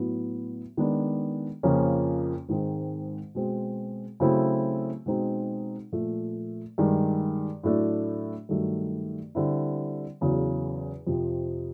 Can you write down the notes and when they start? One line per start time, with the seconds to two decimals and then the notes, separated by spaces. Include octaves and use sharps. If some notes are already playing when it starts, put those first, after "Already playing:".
Already playing: A2 F#3 B3
0.77 D#3 G#3 B3 D4
1.63 F2 C#3 F3 A#3 C#4
2.49 G#2 D#3 G#3 C4
3.35 B2 G#3 C4
4.20 C#3 F#3 A3 C4 E4
5.06 B2 G#3 C4 D#4
5.92 A#2 F3 A3
6.78 G2 D#3 G#3
7.64 A2 F#3 A3 D4
8.49 G2 D#3 F#3 A3
9.35 D3 G3 C4 E4
10.21 E2 C#3 F#3
11.07 F2 C3 F3